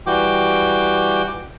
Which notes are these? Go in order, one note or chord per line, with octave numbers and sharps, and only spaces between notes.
E3 G3 F#4 G5 D6